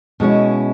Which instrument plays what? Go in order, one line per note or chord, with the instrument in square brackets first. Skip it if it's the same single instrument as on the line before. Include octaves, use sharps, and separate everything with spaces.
[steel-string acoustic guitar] B2 G#3 C#4 E4